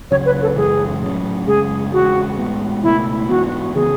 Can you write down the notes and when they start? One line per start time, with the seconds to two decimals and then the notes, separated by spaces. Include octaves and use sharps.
0.11 C#2 C#3 F#3 C#5
0.26 B4
0.42 A4
0.56 F#2 C#3 E3 G#3 G#4
1.01 A2 F#3 C#4
1.47 F#2 C#3 G#3 G#4
1.92 E2 C#3 G#3 F#4
2.38 A2 G#3 B3
2.83 C#2 B2 F#3 A3 E4
3.29 G#2 E3 B3 F#4
3.75 C#3 E3 B3 G#4